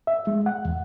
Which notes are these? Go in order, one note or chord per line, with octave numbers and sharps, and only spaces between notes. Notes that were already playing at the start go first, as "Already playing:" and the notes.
E5
G#3
F#5
E2